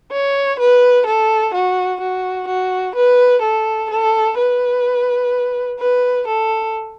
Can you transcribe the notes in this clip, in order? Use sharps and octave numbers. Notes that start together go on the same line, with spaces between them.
C#5
B4
A4
F#4
F#4
F#4
B4
A4
A4
B4
B4
A4